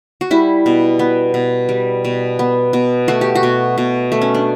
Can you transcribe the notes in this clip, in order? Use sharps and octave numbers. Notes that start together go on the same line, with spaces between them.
F#4
G3 E4
B2
B3
B2
G3
B2
B3
B2
A3 F#4
G4
F#4
B2
B2
A3
C#4
D4